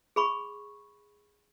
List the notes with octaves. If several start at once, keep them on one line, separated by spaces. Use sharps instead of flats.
G#4 B5 C#6